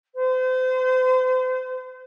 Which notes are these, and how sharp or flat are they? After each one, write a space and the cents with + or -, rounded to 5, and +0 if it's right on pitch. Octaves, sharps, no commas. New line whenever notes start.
C5 -35